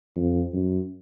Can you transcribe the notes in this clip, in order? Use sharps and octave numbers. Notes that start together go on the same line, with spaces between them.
F2
F#2